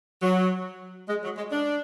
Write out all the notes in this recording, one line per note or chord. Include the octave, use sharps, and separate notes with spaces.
F#3
G#3
F#3
G#3
D4